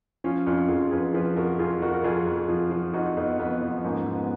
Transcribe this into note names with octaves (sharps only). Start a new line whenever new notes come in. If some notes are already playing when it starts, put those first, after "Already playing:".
F3 C#4 F4
F2 C#4 F4
F2 F4 G#4
F2 G#4 B4
F3 G#4 B4
F2 F#4 A#4
F2 F4 G#4
F2 F#4 A#4
A#4
F2 F4 G#4
F2
F3
F3
F2 D#4 F#4
F2 B3 D#4
F2 B3
F3 B3
G#2 A#3 C#4
G#2
B3